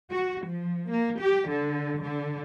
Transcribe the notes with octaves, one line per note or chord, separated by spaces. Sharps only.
F#4
F3
A#3
G4
D3
D3